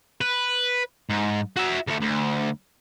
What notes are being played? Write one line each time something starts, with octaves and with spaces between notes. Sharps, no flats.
B4
G#2
F#4 E5
D2 A3
D2